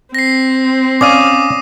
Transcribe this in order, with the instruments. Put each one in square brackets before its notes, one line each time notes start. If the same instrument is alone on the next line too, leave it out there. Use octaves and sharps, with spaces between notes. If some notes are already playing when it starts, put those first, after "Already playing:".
[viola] C4 [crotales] A#6 C7
[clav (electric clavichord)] C#4 D5 F5 [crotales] D6 D#6 D#7